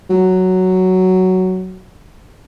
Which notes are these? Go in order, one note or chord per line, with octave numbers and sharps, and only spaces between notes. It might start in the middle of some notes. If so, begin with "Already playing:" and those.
F#3